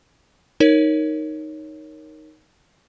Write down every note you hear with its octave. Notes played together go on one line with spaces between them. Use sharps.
D#4 A#4 C#5